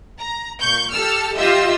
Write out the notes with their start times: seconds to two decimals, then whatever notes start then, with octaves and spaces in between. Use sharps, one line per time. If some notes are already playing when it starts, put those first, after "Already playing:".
0.20 A#5
0.60 A#2 C#6 G6
0.93 G4 A4 A5 E6 F6
1.36 F4 G4 D#5 E5 E6